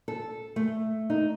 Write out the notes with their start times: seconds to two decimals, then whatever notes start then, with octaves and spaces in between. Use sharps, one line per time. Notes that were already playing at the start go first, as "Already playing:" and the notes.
0.08 A4
0.56 A3
1.10 D#4